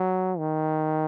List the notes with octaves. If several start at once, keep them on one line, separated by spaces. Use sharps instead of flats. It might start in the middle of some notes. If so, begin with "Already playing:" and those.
Already playing: F#3
D#3